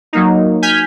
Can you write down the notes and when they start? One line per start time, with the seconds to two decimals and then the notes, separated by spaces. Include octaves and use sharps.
0.13 F#3 A#3 D#4
0.62 G#5 F6 G6 B6